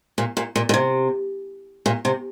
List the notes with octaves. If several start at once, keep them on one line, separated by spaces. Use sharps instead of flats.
A#2
A#2
A#2
A#2
C3
A#2
C3